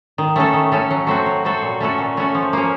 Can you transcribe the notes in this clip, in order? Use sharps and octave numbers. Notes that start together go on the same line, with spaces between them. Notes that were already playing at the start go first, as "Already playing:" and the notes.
D#3
A3 C#4 A4
D#3
A3 C#4 A4
F#3
A3 C4 F#4 A4
F#3
A3 C4 F#4 A4
A#2
A3 C#4 F#4 A4
A#2
A3 C#4 F#4 A4
F3
A#3 C#4